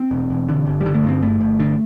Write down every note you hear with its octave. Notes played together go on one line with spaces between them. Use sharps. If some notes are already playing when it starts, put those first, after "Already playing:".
Already playing: C4
E1
E1
D3
G1
G3
D3
A3
G2 C4
G1 A3
G1
D3